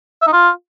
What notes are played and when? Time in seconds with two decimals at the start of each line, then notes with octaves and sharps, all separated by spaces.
0.22 E5
0.27 D#4
0.32 F4